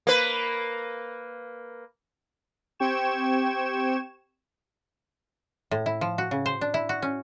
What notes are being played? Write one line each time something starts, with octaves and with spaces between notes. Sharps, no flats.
A#3 B4
C4 G4 G5 C#6 G#6 E7
A2
E4
F3
F#4
C#3
C5
D4
E4
F#4
C#4